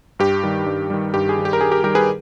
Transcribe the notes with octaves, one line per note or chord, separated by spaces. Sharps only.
G2 G4
D#3 G3
G2
D#3 G3
G2 G4
G#4
D#3 G3
G4
A#4
G2 G#4
G4 A#4
D#3 G3 G4 A#4
G#4 B4